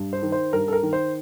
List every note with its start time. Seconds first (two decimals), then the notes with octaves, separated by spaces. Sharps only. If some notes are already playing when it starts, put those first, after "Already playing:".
Already playing: G2
0.13 C5
0.23 D#3
0.32 C5
0.53 G2 A#4
0.68 A4
0.73 A#4
0.83 D#3
0.93 C5